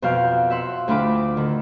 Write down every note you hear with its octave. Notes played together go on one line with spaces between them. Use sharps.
F2 B2 F#4 F5 G6
E5 F#5 C6
D2 A2 D4 F4 B5 D6
D3 D#3